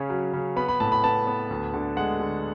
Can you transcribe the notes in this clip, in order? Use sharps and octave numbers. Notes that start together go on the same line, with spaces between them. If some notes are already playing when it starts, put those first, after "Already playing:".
Already playing: C#3 C#4
F#3
C#3
B3 B5
B5
A2 A5
B5
B3 A5
B3
D2
D3
G#3 F#5
D3